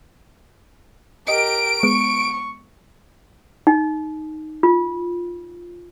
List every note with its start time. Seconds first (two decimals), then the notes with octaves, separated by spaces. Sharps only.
1.28 G4 A#4 D#5 D7
1.83 G#3 B3 C#6
3.67 D#4
4.63 F4